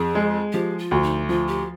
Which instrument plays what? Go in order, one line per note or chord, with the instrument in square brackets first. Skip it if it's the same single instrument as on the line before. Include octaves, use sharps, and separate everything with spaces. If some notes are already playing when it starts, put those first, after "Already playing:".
Already playing: [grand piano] F2 [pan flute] G#4
[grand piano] G#3
[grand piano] F3 [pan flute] G4
[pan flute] F4
[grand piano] D2
[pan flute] D#4
[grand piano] F3 [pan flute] F4
[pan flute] G4